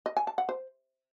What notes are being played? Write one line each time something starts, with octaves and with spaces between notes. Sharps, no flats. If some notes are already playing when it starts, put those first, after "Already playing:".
D#5
G#5
A5
F#5
C5